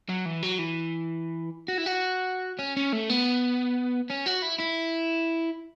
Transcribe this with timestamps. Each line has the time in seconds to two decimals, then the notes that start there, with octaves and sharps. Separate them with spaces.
0.09 F#3
0.26 E3
0.42 F#3
0.58 E3
1.68 F#4
1.78 E4
1.86 F#4
2.59 C#4
2.77 C#4
2.93 A3
3.10 B3
4.10 C#4
4.27 F#4
4.43 E4
4.60 E4